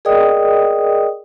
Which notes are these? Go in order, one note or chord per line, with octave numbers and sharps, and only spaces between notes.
G#4 A#4 D5 D#5 G5 D#6